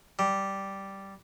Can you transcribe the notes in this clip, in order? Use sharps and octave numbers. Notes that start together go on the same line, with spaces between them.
G3